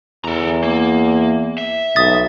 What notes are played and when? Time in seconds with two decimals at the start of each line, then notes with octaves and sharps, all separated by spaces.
0.25 E2 A4 A#5
0.64 A#3
1.58 E5
1.96 B1 D#6 A6